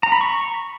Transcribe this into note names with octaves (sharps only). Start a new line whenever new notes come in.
A#5
B5
C#6